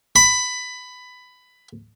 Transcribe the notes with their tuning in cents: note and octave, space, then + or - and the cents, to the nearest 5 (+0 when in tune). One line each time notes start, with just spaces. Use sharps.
B5 +15